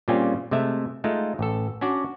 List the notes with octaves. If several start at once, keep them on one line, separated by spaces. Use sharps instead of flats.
A#2 G3 C4 C#4 F4 G#4
C3 G#3 A3 E5
G#3 A3 D#4 F4
A1 A4
C#4 D4 F#4 D5